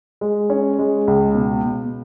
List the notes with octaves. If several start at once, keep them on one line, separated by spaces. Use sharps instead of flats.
G#3
C#4
G#3
C#2
B2
B2